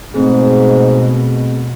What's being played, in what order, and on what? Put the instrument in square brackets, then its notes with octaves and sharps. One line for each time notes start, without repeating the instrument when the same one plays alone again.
[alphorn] G#2 [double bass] B2 [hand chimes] A3 C4 G#4